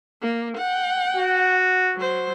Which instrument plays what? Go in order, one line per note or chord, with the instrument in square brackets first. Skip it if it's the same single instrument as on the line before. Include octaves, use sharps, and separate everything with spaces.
[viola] A#3
F#5 G5
[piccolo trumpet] F#4
[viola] F#3 C5